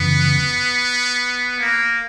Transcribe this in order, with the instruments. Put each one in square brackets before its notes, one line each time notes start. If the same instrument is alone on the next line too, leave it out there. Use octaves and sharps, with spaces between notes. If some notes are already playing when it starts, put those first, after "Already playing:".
Already playing: [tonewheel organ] F#2 C#3 E3 [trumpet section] B3
[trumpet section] A#3